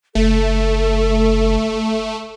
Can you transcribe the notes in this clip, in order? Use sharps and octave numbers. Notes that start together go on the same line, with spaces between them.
F#1 A3 A4